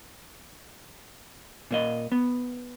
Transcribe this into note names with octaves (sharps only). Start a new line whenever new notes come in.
A#2 A#3 D#5
B3